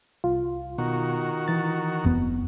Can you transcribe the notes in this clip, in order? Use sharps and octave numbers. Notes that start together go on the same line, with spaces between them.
C2 F4
B2 D#3 F#4
E3 A6
F1 F2 B3